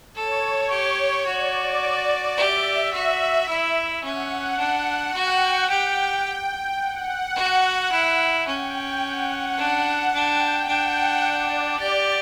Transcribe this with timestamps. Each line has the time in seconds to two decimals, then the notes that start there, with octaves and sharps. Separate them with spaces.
0.15 A4 C#5
0.70 G4
1.26 F#4 D5
2.37 G4 E5
2.93 F#4
3.48 E4
4.03 C#4 F#5
4.58 D4
5.13 F#4 G5
5.69 G4
6.80 F#5
7.36 F#4
7.91 E4
8.47 C#4 G5
9.02 F#5
9.58 D4
10.13 D4 G5
10.67 D4 F#5
11.23 D5
11.79 G4